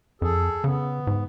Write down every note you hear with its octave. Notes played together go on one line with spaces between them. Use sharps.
F2 G#4 A4
C#3 B3
G#2